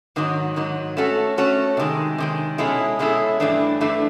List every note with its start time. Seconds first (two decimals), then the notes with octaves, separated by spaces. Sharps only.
0.16 G#2 D#3 F#3
0.56 G#2 D#3 F#3
0.97 A3 C#4 F#4 A4 C#5
1.37 A3 C#4 F#4 A4 C#5
1.77 C3 D#3 G#3
2.18 C3 D#3 G#3
2.58 B2 G#3 C#4 E4 A4
2.99 B2 G#3 C#4 E4 A4
3.40 G2 E3 A3 D4
3.81 G2 E3 A3 D4